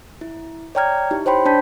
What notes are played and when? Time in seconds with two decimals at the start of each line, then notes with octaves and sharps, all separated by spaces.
0.21 E4
0.75 C#5 D5 G5 A#5 F6 G#6
1.11 D#4 E4 G4
1.26 C5 C#5 G5 B5 C6
1.45 D4 C5 D5 A5 G6 B6